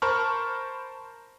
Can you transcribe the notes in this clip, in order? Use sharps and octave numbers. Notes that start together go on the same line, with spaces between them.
A#4 C5 A5 B5 C#6 F6